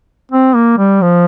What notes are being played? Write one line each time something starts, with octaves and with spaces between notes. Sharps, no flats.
C4
A#3
G3
F3